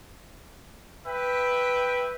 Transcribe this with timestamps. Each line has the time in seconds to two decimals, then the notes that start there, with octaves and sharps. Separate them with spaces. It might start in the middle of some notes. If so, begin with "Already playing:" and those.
1.06 B4 E5 G5